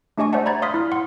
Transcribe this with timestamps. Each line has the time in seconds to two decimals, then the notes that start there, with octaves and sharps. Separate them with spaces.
0.18 A3 D4 G4 D#5 G#5 C#6
0.33 C5 D5 E5 F#5 A5
0.46 D5 A#5 B5 G#6 A6
0.62 D5 F5 C6 D#6 F6 B6
0.74 E4 F6
0.92 F#5 C6